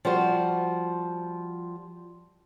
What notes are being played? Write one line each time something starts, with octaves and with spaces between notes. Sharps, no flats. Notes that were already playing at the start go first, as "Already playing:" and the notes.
F3 G3 F#4 C5